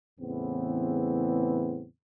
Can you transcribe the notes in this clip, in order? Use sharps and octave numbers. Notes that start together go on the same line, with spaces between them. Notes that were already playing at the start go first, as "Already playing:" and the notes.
E2 A2 C#3 E3 B3 C4